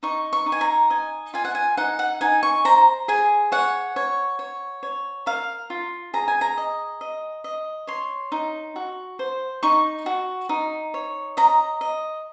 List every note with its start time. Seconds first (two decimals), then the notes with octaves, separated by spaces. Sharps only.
0.03 D#4 C#6
0.33 C#6
0.46 D#4
0.52 G#5
0.61 A#5
0.90 D#5 G#5
1.34 F4 G#5
1.45 F#5
1.55 G#5
1.77 D#4 F#5
1.99 F#5
2.21 D#4 G#5
2.43 C#6
2.65 C5 A#5
3.08 G#4 G#5
3.52 C#5 F#5
3.96 C#5
4.39 C#5
4.83 C#5
5.26 A#4 F5
5.70 F4
6.14 G#4 A#5
6.28 G#5
6.41 A#5
6.57 D#5
7.01 D#5
7.44 D#5
7.87 C#5 C6
8.32 D#4
8.76 F#4
9.19 C5
9.63 D#4 C#6
10.06 F#4
10.49 D#4
10.94 C#5
11.37 D#5 A#5
11.81 D#5